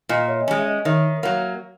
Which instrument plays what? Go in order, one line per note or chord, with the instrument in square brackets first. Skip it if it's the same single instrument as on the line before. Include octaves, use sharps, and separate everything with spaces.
[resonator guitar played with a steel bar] A#2 [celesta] D#5
[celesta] C#5 E5
D#5
[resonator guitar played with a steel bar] G#3 C#4 [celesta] C#5
[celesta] E5
D#5
[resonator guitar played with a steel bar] D#3 [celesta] C#5 E5
[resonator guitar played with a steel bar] F#3 A#3